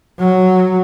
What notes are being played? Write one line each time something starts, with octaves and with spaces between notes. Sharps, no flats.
F#3